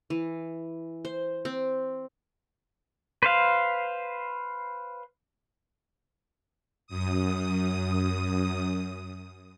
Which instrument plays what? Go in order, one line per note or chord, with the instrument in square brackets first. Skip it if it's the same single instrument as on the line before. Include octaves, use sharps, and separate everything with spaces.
[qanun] E3
C5
C4
[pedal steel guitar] B4 C5 F5
[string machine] F#2 D#6